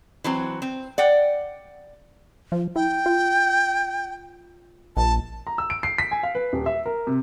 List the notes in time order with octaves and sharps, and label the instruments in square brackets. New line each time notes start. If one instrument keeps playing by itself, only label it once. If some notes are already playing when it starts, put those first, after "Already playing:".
[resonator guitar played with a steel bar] E3 F#3 C4
C4
D5 F#5 G5
[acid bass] F3
[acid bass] E4 [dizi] G5
[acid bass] F4
[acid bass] A#1 [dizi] A5
[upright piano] A#5
E6
D7
C7
B6
G#5
F5
B4
D#1
E5
A#4
C3